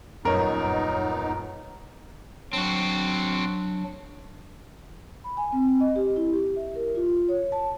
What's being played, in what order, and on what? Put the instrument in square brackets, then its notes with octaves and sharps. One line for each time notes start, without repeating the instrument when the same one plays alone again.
[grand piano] D#1 A#4 [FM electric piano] F#2 C#5 D#5 [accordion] B3 D#4
[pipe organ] F#3 D4 [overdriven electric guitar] C4 F#4
[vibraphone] B5
G#5
C4
D#5
G4
E4
G4
E5
A#4
F4
C#5
A5